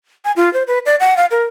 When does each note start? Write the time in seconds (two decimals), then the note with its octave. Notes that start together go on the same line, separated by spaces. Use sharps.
0.25 G#5
0.36 F4
0.53 C5
0.67 B4
0.86 D5
1.00 F#5
1.17 F5
1.31 A#4